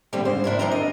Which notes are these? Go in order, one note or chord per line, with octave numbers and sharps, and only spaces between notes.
D3 G3 A3 A#3 C4 D4
G#2 C#3 C5
D4 E4 A#4
D#3 C4 D4 A#4 C5 A#5
D#5